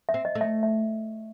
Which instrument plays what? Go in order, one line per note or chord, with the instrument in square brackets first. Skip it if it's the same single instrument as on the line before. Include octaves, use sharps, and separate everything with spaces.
[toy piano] E5
[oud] C4
[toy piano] D#5
[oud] A3
[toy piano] E5
E5